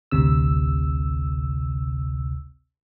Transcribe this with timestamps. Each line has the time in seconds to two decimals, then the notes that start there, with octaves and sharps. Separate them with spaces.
0.11 A1 D2 C3 E6